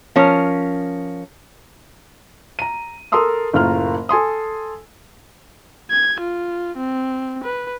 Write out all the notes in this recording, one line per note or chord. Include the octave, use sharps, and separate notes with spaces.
F3 C#4 A#4
A#5 D#7
A4 A#4 A5 C6 D#6 E6
F#1 A2 A#3 F4 A#4 F6
A4 G#5 C6 D#6
G#6
F4
C4
B4